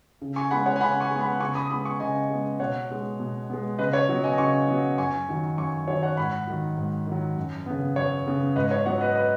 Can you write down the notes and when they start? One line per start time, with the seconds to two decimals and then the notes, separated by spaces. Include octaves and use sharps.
0.22 C#3
0.36 G#5 C#6
0.51 G#3 B3 F#5 B5
0.66 C#5 F#5
0.76 G#5
0.81 C#3 F#5 B5
1.00 G#5 C#6
1.11 G#3 B3
1.21 F#5 B5
1.40 C#3 G#5 C#6
1.55 B5 D#6
1.70 G#3 B3 B5 D#6
1.85 G#5 C#6
2.00 C#3 D#5 G#5
2.30 G#3 B3
2.60 B2 C#5 F#5
2.90 G#3 B3
3.20 B2
3.49 G#3 B3
3.79 C#3 B4 D#5
3.93 C#5
4.09 F#3 B3
4.24 D#5 G#5
4.38 C#3 G#5 C#6
4.68 F#3 B3
4.98 F#2 G#5 C#6
5.28 D#3 F#3
5.58 F#2 G#5 C#6
5.88 D#3 F#3 C#5
6.03 C#5 F#5
6.17 G#2 F#5 B5
6.47 D#3 F#3
6.77 G#2
7.07 D#3 F#3
7.37 F#2
7.66 C#3 B3
7.96 F#2 C#5
8.26 C#3 B3
8.56 G#2 B4 D#5
8.71 C#5
8.85 F#3 B3 C#5 F#5
9.01 B4 D#5
9.15 B4 D#5